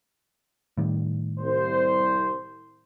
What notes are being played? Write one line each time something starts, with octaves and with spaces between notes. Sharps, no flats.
A2 D#3 G3
C2 C5